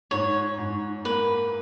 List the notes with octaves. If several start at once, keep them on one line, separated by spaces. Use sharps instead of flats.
G#2 C#5
G#2
A#3 B4